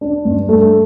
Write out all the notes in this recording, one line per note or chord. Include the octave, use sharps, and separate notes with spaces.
D4
G2
A3